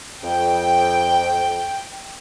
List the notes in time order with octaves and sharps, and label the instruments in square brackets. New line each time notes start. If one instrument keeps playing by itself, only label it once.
[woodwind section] F2 [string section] G5